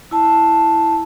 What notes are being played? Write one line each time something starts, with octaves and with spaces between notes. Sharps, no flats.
E4 A5